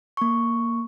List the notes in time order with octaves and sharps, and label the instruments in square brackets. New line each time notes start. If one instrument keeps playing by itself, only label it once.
[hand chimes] A#3 C#6